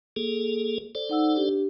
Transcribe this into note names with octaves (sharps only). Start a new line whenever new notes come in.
A#3 G#4 A4
A4 C5 D5
D#4 F#5 E6
D4 G4